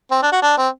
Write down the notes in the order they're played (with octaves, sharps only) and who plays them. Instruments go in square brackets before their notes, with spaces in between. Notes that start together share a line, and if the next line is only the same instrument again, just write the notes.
[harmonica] C4
D4
F#4
D4
C4